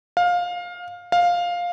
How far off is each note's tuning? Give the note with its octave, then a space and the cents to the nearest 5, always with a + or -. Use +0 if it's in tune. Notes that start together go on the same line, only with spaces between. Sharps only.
F5 +20
F5 +10